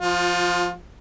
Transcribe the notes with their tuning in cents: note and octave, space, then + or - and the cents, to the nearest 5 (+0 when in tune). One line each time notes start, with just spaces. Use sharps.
F3 +0 F4 +25